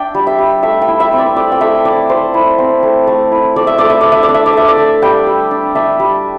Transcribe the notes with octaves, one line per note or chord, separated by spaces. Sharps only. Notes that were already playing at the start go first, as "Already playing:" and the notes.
Already playing: D4 E5 G5
G3
E5
G3
A3 E5
G5
E4
E5
C4
D5
A3 D5
G5
A3 E5
E4 D5
A3 C5
E4
C4
A3
A3
E4
A3 D5
E5
A3 D5
E5
D4 D5
E5
D5
D4
E5
D5
A3 E5
D5
A3
G3 G5
G3
D4
D4 E5
G3